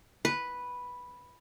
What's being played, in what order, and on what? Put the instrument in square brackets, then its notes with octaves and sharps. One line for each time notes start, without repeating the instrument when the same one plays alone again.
[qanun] B4